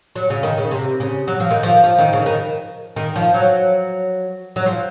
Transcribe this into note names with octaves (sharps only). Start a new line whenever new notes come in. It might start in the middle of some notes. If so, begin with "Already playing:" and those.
F#3
C#3
D#3
C#3
C3
C#3
F#3
F3
D#3
F3
F3
D#3
C#3
D#3
D#3
F3
F#3
F#3
F3